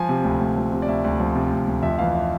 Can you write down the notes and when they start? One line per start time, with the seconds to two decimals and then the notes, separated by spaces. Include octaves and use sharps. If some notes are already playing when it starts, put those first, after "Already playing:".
Already playing: F3 G#5
0.09 C3
0.24 D2
0.40 D2
0.57 F3
0.72 C3
0.82 D5
0.88 D2 E5
1.04 D2
1.20 F3
1.36 C3
1.52 D2
1.67 D2
1.83 F2 E5
1.98 E3 F5
2.15 E5